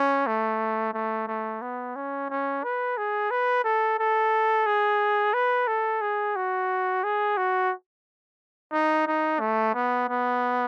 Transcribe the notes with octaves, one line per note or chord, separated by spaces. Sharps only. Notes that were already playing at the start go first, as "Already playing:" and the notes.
Already playing: C#4
A3
A3
A3
B3
C#4
C#4
B4
G#4
B4
A4
A4
G#4
B4
A4
G#4
F#4
G#4
F#4
D#4
D#4
A3
B3
B3